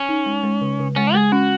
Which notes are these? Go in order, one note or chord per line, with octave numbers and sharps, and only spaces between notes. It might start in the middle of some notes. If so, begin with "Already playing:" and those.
Already playing: C#4
D#4
G#3
G#3
C#3
C#3
G#3 C#4
G#3 G#4
C#4 F#4